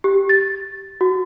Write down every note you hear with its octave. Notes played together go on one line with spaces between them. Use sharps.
G4
A6
F#4